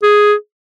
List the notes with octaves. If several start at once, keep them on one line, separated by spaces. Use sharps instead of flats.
G#4